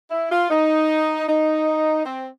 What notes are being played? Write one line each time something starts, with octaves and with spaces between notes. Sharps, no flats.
E4
F4
D#4
D#4
C4